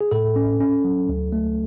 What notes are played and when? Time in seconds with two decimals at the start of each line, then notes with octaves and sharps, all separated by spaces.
0.01 G#4
0.11 A2 A4
0.36 C#4
0.60 C#4
0.84 F#3
1.09 D2
1.32 A3